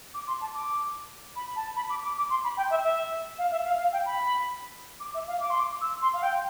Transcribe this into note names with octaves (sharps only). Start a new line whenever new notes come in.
D6
C6
A5
D6
B5
A5
B5
D6
D6
D6
C6
B5
G5
E5
E5
F5
E5
F5
F5
G5
B5
D6
E5
F5
D6
C6
D6
E6
C6
F5
G5